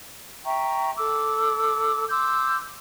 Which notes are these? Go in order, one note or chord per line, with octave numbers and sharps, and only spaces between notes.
E5 G5 A#5 C#6
A4 D6 E6
C6 D6 E6 G6